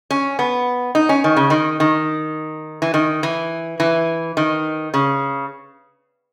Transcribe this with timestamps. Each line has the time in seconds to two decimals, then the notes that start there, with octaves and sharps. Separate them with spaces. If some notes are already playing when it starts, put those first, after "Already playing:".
0.11 C#4
0.39 B3
0.95 D#4
1.09 C#4
1.24 D#3
1.37 C#3
1.50 D#3
1.80 D#3
2.82 E3
2.94 D#3
3.23 E3
3.80 E3
4.37 D#3
4.94 C#3